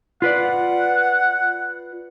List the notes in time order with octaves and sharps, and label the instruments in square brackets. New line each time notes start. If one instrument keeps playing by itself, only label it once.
[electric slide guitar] F4 B4 D5 [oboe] F#5